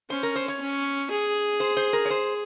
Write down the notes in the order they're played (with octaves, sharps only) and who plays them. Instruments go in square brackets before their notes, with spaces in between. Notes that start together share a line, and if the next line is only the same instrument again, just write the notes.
[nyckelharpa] C#4 [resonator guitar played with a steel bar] C5
[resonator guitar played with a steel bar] A#4
C5
C#5
[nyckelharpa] C#4
G#4
[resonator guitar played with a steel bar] C5
C5
A#4
C#5
C5